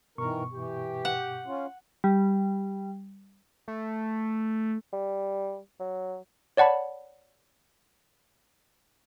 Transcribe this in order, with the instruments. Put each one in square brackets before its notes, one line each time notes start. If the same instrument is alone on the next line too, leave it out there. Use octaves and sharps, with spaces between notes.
[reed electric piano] G2 B2 C#6 [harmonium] D#3 E3 A#4
[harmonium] E3 [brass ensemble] G4
[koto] F#5
[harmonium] C#4 F4
[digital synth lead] G3
[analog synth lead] A3
[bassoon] G3
F#3
[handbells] C#5 D5 F#5 A5 B5